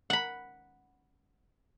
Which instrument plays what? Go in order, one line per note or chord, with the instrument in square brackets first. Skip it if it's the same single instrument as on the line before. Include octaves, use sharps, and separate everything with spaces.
[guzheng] F#5 B5